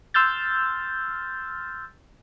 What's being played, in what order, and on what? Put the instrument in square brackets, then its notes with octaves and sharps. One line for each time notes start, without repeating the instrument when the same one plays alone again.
[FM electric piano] C6 E6 F6 G6 A6